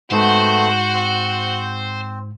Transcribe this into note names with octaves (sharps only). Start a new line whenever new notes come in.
G#2 A3 B3 C4 F#4 C5
C4